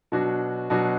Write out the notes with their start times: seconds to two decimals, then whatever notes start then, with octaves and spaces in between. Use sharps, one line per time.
0.12 B2 F#3 D4 F#4
0.70 B2 F#3 D4 F#4